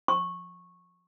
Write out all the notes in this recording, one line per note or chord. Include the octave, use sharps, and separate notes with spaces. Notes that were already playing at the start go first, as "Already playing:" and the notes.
C#6